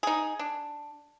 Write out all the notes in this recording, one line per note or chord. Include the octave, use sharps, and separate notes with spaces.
D#4 G#4
D4